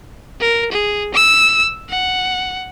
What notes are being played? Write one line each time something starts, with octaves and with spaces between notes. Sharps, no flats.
A#4
G#4
E6
F#5